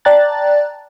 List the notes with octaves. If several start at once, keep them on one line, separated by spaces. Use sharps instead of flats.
D5 G5 A5 A#5 F#6 A6